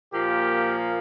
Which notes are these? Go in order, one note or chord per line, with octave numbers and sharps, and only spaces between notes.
A#2 F3 A#3 G4